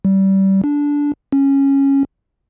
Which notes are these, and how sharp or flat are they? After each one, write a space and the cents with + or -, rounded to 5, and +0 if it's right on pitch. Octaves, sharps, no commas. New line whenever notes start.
G3 -25
D4 -15
C#4 -10